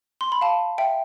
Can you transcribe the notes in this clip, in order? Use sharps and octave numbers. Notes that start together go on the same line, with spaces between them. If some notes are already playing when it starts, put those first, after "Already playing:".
C6
B5
F5 A5
E5 G5